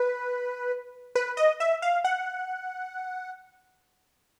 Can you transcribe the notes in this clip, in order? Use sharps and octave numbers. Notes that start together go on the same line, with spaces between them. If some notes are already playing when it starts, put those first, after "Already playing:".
Already playing: B4
B4
D#5
E5
F5
F#5